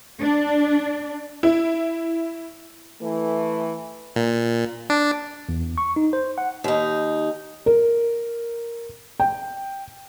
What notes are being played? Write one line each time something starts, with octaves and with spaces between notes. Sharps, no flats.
D4
E4
E3 A3
A#2
D4
E2
C#6
D#4
C5
F#5
D#2 D#4
A#4
G5